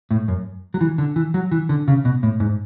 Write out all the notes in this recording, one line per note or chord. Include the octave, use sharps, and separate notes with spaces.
A2
F#2
F#3
E3
D3
E3
F#3
E3
D3
C#3
B2
A2
G#2